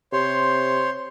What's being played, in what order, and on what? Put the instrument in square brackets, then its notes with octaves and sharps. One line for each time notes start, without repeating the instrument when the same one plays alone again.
[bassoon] C3 [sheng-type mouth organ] C5 C#5 C6